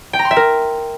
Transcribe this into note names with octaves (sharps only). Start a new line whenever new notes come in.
G5
A#5
C6
E5
A#4